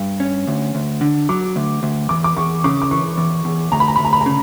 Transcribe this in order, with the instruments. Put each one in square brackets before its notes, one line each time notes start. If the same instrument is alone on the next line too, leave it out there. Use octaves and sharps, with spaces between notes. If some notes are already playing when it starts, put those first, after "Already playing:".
Already playing: [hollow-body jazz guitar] G2
C#4
D2
D2
D3
[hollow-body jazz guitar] F#3 [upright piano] D6
[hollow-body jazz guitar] D2
D2
[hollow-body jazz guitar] E2 [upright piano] D6
[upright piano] D6
[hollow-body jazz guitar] E2 [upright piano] C#6
[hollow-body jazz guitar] C#3 [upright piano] D6
[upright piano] D6
[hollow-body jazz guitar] E3 [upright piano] C#6
[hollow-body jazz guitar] E2
E2
[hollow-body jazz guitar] D2 [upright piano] A#5
[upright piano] B5
A#5
B5
[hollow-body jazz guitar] D2
[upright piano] A#5
B5
A#5
[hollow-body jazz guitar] C#3